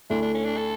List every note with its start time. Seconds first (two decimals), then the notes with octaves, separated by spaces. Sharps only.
0.10 D2 D3 A3 D4 E4
0.22 D4
0.34 C#4
0.45 D4
0.57 A4